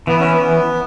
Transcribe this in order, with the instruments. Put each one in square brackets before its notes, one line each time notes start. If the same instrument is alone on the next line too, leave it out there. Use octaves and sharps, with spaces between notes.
[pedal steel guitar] E3 [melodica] B3
[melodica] C#4
B3